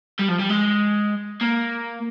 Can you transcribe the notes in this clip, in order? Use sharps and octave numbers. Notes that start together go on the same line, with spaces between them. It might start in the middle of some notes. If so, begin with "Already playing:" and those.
G3
F3
G3
G#3
A#3